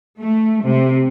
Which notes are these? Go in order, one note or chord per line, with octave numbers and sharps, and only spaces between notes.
A3
C3